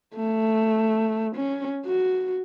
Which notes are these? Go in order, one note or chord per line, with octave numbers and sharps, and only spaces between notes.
A3
C#4
F#4